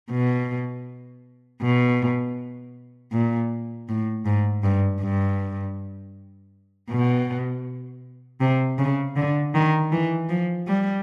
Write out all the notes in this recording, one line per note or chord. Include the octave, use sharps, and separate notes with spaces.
B2
B2
A#2
A2
G#2
G2
G2
B2
C3
C#3
D3
D#3
E3
F3
G3